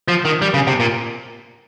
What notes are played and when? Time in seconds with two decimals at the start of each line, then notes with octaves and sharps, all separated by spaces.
0.08 F3
0.25 D#3
0.42 G3
0.54 C#3
0.67 C3
0.80 A#2